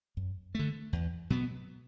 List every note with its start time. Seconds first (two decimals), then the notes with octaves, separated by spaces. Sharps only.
0.17 F#2
0.55 D3 A3
0.93 E2
1.30 B2 F#3 B3